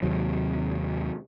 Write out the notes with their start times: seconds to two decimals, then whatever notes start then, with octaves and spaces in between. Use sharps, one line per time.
0.03 D#2 C3 F#3